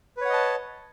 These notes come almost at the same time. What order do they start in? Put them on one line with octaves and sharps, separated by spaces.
B4 C#5 F#5 D#5 A5